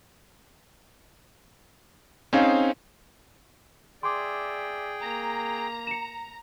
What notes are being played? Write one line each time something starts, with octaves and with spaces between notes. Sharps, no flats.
C4 C#4 D#4 G#4 C5 F5
G#4 D5 E5 G5 C6 D6
A#3 A#5
C#7 E7